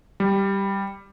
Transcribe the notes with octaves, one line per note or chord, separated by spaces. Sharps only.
G3